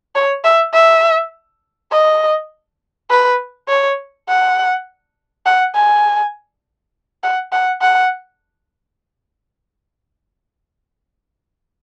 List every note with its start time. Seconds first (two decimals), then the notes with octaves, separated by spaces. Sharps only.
0.15 C#5
0.44 E5
0.73 E5
1.92 D#5
3.10 B4
3.68 C#5
4.29 F#5
5.46 F#5
5.75 G#5
7.23 F#5
7.52 F#5
7.81 F#5